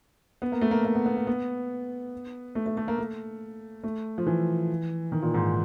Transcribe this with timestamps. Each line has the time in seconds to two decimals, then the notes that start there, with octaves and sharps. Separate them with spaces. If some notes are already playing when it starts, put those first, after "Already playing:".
0.42 B3
0.52 A#3
0.61 A3
0.71 A#3
0.85 A#3
0.95 B3
1.06 B3
1.17 A#3
1.27 B3
2.55 A3
2.66 A3
2.77 A3
2.88 A#3
2.98 A3
3.83 A3
4.18 F3
4.27 E3
5.12 D#3
5.23 A#2
5.34 G#2